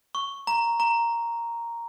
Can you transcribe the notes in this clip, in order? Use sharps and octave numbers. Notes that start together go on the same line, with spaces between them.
C#6
A#5
A#5